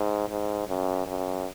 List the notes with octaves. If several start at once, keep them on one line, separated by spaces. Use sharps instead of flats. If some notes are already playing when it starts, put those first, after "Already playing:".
Already playing: G#2
G#2
F#2
F#2